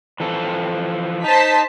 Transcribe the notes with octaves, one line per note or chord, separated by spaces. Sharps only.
E3 F3 A4
D#4 C5 A5 B6